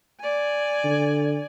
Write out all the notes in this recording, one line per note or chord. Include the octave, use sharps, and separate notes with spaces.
D5 G#5
D3